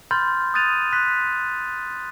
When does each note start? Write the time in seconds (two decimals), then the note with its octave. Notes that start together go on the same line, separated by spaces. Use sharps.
0.11 B5 C6 F6 G6 A6
0.54 D#6 F#6 G6 A6 D#7 F7
0.92 C6 F#6 B6